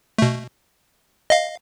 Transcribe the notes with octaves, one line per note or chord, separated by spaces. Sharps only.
B2 A3
D#5 F5